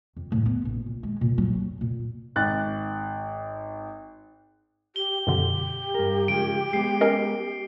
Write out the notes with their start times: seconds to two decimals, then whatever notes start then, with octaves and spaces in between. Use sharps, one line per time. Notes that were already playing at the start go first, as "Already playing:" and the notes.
0.16 F2
0.32 A2
0.46 B3
0.65 A1
0.86 A#2
1.03 G#3
1.21 A#2
1.38 F#3
1.55 F2
1.81 A#2
2.36 G#1 F#6 A6
4.96 G4 G7
5.27 F#2 B2 D3 G4
5.94 G2 A#4
6.28 C#3 F3 G#3 D7
6.73 G#3 B3 C7
7.01 C#4 A#4 D#5